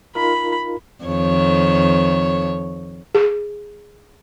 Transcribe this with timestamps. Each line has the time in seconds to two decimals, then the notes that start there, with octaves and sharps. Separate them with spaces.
0.15 D#4 F4 A#4 B5
1.04 F2 D#3 C#5
3.15 G#4